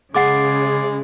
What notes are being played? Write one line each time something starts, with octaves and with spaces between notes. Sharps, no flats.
C#3 G#3 G#4 F#5 D6 A6 C7